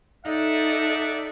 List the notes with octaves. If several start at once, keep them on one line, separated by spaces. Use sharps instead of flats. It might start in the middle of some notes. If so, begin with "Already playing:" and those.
D#4 A4 D5 E5 F#5